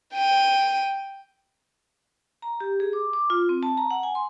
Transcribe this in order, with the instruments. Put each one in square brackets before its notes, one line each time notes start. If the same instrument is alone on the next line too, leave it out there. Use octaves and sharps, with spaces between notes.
[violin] G5 D#7
[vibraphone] A#5
G4
G#4
D6
D6
F4
C4
A5
A#5
F#5
G#5
C6